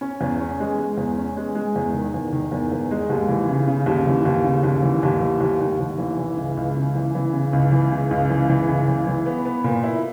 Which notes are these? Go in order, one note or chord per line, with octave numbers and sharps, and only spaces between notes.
C#4
E2
C#4
G#3
G#3
E2
C#4
G#3
G#3
E2
D#3
E2
D#3
E2
E2
G#3
D#2
E3
C#3
C#3
D#2
E3
D#2
C#3
D#2
E3
D#2
E3
D#2
D#2
D#2
E3
E3
C#2
C#2
C#3
E3
E3
C#3
C#2
E3
C#3
C#2
E3
E3
C#2
E3
E3
B3
B3
A#2
E4